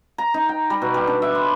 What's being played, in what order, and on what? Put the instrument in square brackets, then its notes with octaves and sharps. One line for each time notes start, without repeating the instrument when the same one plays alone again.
[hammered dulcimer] A#5
D#4
G5
G3
B2
G3
D4
E5
C6